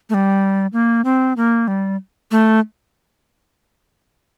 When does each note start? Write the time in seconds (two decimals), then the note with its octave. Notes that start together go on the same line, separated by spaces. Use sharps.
0.10 A3
0.14 G3
0.73 A#3
1.05 C4
1.37 A#3
1.68 G3
2.31 A3